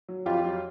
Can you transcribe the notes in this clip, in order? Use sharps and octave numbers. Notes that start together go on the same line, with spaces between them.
F#3
F2 F4 G4
F#3